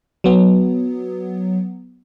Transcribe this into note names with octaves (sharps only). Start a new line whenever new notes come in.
F#3 B3